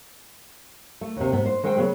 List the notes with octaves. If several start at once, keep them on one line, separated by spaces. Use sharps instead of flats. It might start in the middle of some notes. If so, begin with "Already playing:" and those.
A3
D#2 C3
G#2 B3
C5
D#3 G#3 A4 C5 G5
C#3 F#3 B3 G#4